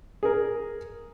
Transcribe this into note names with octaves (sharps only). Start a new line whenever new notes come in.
G#4 A#4